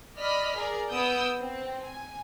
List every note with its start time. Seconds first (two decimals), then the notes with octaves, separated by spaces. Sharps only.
0.19 D5 D#5 B5 F6 B6
0.56 G#4 A#4 D5
0.89 B3 D#6 E6 G6 D7
1.41 C4
1.82 G#5